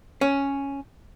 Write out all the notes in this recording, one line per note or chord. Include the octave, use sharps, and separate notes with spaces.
C#4